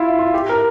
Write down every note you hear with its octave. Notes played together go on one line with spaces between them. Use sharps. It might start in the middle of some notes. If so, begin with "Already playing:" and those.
Already playing: E4 F4
F4
G4
A#4